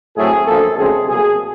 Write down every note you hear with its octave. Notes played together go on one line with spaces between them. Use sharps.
A2 F#3 A3 C4 G#4
F#2 D3 F3 A#3 A4
D2 C#3 F3 G#3 C4 G#4
C2 B2 F#3 A#3 G#4